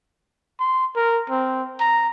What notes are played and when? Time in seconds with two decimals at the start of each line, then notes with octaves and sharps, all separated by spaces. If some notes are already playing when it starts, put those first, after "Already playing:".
0.60 C6
0.96 A#4
1.30 C4
1.80 A#5